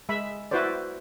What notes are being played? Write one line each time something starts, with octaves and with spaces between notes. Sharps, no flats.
G#3 E5 B5
E4 F#4 B4 C5 D5